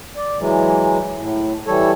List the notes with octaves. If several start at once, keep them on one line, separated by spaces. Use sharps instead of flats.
D5
E3 F#3 G#3
A2
E3 G3 A4 C#5